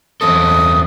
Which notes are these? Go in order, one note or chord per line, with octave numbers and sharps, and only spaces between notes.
E2 C4 A4 D#6